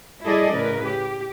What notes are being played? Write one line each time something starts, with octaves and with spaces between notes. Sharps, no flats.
G3 E4 G#4 A4 D5 D#5
A2 C#3 A#4 B4
G4